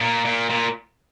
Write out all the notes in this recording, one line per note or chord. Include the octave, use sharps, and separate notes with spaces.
A#2
A#2
A#2